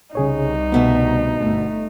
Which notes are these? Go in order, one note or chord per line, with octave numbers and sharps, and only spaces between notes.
C2 C#3 D#4 G#4 C#5
D2 B2 B3 E5
G1 A3